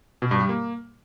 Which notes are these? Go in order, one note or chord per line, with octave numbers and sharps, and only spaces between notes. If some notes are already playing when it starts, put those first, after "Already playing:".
B2
G2
G3
A#3